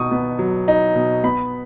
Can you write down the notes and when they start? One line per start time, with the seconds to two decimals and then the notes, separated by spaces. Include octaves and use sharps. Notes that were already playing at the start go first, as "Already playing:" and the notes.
Already playing: B2 D#4 C#6 D#6
0.11 B3
0.39 F#3
0.68 D#4
0.95 B2
1.24 B3 B5